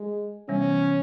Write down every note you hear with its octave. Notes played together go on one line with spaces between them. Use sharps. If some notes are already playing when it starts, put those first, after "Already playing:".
Already playing: G#3
C3 E3 G3 B3 C#4